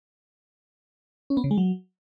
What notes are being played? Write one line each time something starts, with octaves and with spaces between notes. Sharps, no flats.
C#4
B3
C#3
G#3
F#3